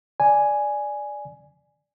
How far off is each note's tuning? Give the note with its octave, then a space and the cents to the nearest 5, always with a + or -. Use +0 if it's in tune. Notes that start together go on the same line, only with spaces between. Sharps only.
D5 +0 G#5 +0